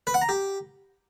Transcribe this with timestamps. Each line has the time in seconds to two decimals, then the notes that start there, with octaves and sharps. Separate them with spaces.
0.07 B4
0.14 F#5
0.22 A#5
0.29 G4